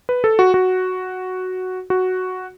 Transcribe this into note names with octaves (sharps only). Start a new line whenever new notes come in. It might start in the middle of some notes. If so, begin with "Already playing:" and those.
B4
A4
F#4
F#4
F#4